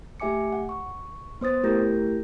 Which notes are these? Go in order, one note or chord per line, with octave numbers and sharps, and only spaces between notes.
A3 G4 E5 G#5 D6 C#7
F#5
C#6
B3 C5 D#6 A6
A3 E4 G4 A#4 G6 A#6